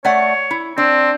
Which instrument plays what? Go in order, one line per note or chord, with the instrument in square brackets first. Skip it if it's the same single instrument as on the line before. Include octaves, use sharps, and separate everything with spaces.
[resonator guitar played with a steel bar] A3 D5 F#5 [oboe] C#5
[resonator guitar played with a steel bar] E4
[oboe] C4 [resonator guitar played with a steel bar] D4